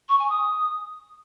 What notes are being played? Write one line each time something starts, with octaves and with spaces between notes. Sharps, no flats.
C#6
G#5
D#6